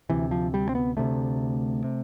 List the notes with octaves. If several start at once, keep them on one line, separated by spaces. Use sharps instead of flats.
D2 C3 E3
F3
G3
C4
B3
D2 C3 A3
C3